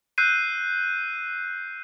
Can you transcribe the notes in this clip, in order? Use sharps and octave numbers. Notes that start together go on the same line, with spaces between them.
E6 F#6 G6 C7 D#7